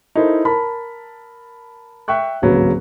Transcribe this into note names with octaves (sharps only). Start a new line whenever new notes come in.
D#4 E4 A4 A#4 C5
A#4 A5 B5
E5 G5 C#6 F#6
D1 G#1 C#3 F#3 A#3 B4